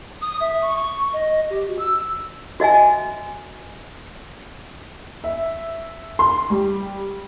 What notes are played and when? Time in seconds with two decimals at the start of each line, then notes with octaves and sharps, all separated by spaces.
0.22 D#6
0.40 E5
0.62 C#6
0.77 C#6
1.13 D#5
1.50 G4
1.67 F#4
1.79 E6
2.60 F#4 D#5 E5 G#5
5.24 E5
6.19 C6
6.50 G3